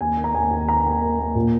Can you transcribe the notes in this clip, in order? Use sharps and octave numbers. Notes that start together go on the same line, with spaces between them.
D#2 G#5
D#3
A#5
D#2 G#5
D#2
D#3 A#5
D#3
A#3
A#3
A#2